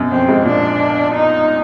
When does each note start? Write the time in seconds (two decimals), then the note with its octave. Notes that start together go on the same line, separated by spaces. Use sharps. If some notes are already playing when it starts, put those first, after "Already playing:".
Already playing: F#2 B2
0.11 F2 C4
0.28 G#2
0.45 A#2 D4
1.14 D#4